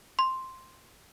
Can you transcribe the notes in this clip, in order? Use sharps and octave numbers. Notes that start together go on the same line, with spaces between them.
C6